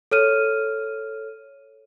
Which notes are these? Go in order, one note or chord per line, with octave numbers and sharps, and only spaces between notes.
A4 C#5 F6 D#7